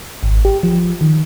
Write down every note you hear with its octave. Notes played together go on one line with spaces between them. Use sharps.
G#1
G4
F3
D#3